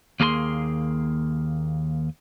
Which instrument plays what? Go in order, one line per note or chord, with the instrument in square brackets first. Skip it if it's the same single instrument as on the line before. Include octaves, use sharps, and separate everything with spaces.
[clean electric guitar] D#2 A#3 G#4 A5 C6